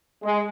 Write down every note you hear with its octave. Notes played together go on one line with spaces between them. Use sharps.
G#3